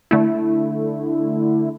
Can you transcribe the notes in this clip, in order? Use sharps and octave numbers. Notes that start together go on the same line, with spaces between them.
D3 A3 E4